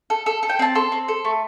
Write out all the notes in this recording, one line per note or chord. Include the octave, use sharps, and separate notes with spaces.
A4
A4
A4
G5
C4 A5
A4 C6
C4
A4
A3